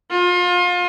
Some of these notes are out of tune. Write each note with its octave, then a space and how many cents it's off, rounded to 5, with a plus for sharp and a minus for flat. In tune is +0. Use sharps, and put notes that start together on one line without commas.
F4 +30